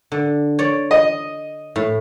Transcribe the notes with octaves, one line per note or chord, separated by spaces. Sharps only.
D3
C#5 D5
D#5
A2